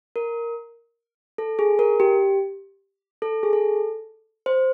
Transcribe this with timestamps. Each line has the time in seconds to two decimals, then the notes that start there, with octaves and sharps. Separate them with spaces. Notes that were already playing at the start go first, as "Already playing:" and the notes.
0.16 A#4
1.38 A4
1.59 G#4
1.79 A#4
2.00 G4
3.22 A4
3.43 G#4
3.53 A4
4.46 C5